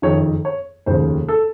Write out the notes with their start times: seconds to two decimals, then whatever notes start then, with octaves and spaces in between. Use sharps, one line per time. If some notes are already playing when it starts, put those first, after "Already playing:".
0.02 F#1 F2 D#3 C#5
0.45 C#5
0.86 F1 D#2 C#3 C5
1.28 A4